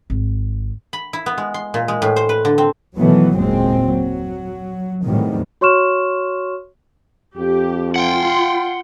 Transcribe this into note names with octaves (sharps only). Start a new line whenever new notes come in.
G#1
B5
E4
B3
G#3
C6
A#2
G#3
A2
C5
B4
D3
C4
B2 D#3 E3 F#3 A3 B3
F#1 D#2 A#2 G#3 C4
F#3
E2 A2 C3 D#3 F#3 G3
F#4 C#5 C6 C#6 F6 E7
F2 G4
F4 F#5 G5 C6